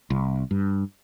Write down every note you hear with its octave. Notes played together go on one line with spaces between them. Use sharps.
C2
G2